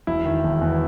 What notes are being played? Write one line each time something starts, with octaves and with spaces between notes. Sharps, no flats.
E1 E4
D#3
E1
E2